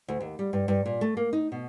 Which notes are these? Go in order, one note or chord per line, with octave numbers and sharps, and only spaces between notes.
D2
D#2
G3
G2
G2
A#2
A3
A#3
D#4
B2